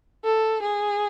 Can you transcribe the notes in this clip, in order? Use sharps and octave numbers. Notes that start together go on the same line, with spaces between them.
A4
G#4